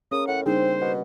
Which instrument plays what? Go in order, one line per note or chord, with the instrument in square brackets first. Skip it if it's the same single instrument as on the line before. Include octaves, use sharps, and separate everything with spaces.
[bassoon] C#3 [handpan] C#4 A#4 [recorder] D#6
[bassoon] A2 [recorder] F#5
[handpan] C#3 G3 A#3 [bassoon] C4 [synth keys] D4 D#4 G#4 [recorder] C5
[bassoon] B2 [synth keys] F#5